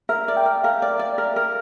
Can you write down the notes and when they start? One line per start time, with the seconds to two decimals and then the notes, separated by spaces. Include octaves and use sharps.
0.09 A#4 E5
0.28 D5
0.37 G5
0.46 A#4
0.64 A#4 F5
0.82 D5
0.99 D5
1.18 A#4
1.36 A#4